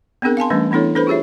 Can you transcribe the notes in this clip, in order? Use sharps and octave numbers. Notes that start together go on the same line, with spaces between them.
B3 C4 D4 G#4 A#4
F5 G#5 A5 C6
E3 G3 A3 C#4 D4
E3 B3 D4 E4 A4 C#5
D4 A4 B4 C5 B5
F4 G4 G#4 C#5 E5